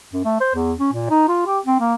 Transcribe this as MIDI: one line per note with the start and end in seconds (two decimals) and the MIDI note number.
0.13 0.23 42
0.25 0.38 57
0.41 0.51 72
0.55 0.73 40
0.79 0.91 61
0.93 1.10 46
1.10 1.27 63
1.28 1.44 65
1.47 1.59 67
1.66 1.79 60
1.80 1.95 58